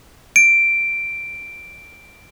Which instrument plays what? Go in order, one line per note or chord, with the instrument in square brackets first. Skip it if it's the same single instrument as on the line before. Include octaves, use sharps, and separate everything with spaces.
[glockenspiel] D7